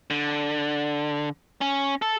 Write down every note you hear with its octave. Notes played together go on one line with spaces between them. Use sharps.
D3
C#4
A4